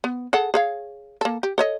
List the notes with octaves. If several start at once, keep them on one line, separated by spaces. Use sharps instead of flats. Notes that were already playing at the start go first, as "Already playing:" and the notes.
B3
G#4 A4 F#5
G#4 C#5 F5
A#3 A4
G4
A4 C#5 D#5